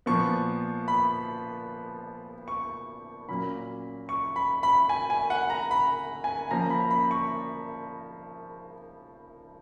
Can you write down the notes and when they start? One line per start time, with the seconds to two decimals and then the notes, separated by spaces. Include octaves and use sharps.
0.06 A#2 F3 B3 C#6
0.88 B5
2.48 C#6
3.29 A#2 F#3 A#3 C#4 B5
4.09 C#6
4.36 B5
4.63 B5
4.89 G#5
5.10 G#5
5.30 F#5
5.50 A#5
5.71 B5
6.24 G#5
6.51 F3 A#3 C#4 A#5
6.70 B5
6.91 B5
7.11 C#6